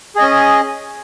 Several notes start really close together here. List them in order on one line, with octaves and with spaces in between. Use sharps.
G#4 D#5 C#4